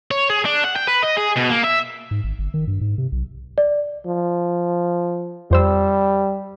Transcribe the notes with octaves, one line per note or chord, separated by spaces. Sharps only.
C#5
G#4
D4
F#5
G5
B4
D#5
G#4
B2
A#3
E5
G#2
G#1
G1
D#3
G2
G#2
C3
B1
D5
F3
F2 G3 C5 E6